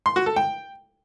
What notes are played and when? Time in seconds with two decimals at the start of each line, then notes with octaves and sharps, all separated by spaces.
0.06 C6
0.16 F#4
0.26 A4
0.36 G5